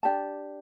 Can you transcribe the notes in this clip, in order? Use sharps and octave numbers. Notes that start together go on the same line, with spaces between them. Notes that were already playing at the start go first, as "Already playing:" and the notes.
D4 G4 D5 A5